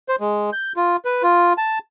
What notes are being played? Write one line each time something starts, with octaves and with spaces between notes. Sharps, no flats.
C5
G#3
G6
F4
B4
F4
A5